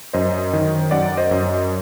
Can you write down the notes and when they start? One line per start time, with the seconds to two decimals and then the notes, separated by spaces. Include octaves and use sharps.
0.13 F#2 C5 D#5
0.53 D#3
0.91 F#2 D5 F#5
1.17 C5 D#5
1.31 F#2